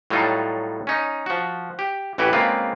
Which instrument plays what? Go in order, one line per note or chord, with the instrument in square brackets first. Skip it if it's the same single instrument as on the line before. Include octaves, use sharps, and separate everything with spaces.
[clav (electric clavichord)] A2 F#3 G3 D#4 F4 A4
C#4 D#4
F3 F#4
G4
A1 E3 F#4 G4 B4
C#3 G#3 A#3 C4 F4 B4